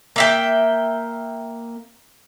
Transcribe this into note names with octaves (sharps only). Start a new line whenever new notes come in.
A#3 E5 G5